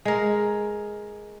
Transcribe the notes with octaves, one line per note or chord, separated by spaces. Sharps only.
G#3 A#4